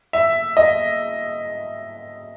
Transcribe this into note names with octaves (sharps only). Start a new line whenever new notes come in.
E5
D#5